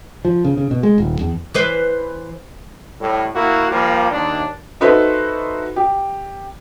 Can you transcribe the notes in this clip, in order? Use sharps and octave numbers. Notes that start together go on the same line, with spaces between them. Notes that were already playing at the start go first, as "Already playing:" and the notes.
F3
C#3
C#3
B2
G#3
D#1
E2
E3 B4 C5
A2 G3
A#3 E4 F#4
F3 G3 A#3
D#2 D4
D#4 F#4 A4 B4 C5 E5
G4